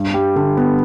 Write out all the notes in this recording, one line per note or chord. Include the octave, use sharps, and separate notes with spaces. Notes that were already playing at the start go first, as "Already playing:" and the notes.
Already playing: G2
G3
D3
B3